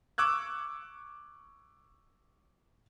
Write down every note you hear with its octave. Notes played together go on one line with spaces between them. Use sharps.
C#6 D6 E6 F#6 G#6